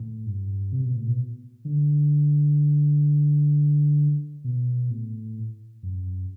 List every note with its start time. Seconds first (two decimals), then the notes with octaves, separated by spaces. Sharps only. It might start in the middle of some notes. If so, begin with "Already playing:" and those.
Already playing: A2
0.26 G2
0.72 C3
0.84 B2
0.96 A2
1.07 B2
1.65 D3
4.44 B2
4.91 A2
5.83 F#2